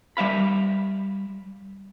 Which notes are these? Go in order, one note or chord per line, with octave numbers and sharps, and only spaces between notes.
G3 E5 F5 B5